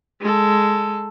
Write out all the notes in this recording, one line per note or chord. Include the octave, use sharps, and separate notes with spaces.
G#3 A4